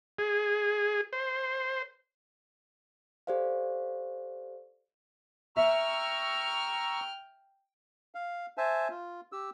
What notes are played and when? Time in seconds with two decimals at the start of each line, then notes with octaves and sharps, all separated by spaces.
0.19 G#4
1.13 C5
3.27 G4 A4 C5 D5 F5
5.57 E5 G5 A#5 C#6 E6 F6
8.15 F5
8.57 C5 E5 G#5 A5
8.90 F4
9.32 G4 E6